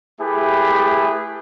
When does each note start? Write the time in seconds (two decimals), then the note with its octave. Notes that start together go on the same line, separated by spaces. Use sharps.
0.19 A3 E4 G4 G#4 B4